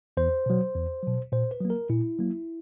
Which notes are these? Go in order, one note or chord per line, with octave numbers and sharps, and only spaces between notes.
E2 C5
B2 F#3
E2
B2 F#3
A#2 C5
B4
F#3 A#3
A#4
A#2 E4
F#3 A#3